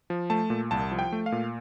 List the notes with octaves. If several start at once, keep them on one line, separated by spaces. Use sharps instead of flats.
F3
A3 A5
A#2
C2 A5
F3
G5
A3
F5
A#2